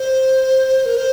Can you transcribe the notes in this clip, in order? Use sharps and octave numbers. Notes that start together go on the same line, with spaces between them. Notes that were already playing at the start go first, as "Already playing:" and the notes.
Already playing: C5
A#4
C5